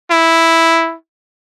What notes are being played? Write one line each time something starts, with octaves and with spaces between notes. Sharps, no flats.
E4